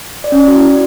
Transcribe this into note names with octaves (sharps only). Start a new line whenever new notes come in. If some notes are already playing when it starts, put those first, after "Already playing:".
D5
C#4
D5
F#4
E4